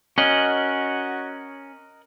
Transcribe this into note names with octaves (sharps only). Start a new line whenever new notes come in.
C#4 F#4 A#4 D#5 F#5